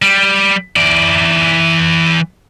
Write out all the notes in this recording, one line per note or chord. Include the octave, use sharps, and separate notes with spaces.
G3
E3 D5